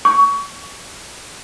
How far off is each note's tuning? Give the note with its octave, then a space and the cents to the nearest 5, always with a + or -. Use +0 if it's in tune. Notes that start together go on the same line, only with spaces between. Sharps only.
C#6 +25